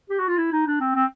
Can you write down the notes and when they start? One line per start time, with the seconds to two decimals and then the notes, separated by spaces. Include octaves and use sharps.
0.10 G4
0.19 F#4
0.28 F4
0.37 E4
0.52 D#4
0.67 D4
0.80 C4
0.95 C4